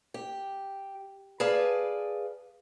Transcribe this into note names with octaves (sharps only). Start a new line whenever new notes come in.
G4
G#4 B4 D5 F5 A5